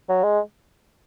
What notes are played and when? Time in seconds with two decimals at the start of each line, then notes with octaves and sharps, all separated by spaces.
0.09 F#3
0.24 G#3